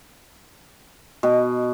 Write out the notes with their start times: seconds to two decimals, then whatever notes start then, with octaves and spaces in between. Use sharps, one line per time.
1.23 B2